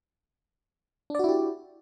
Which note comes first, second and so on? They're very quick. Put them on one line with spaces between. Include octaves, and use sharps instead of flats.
D4 D5 F#4 E4 G4